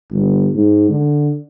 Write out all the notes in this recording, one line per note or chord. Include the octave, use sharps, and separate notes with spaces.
G1
G#2
D3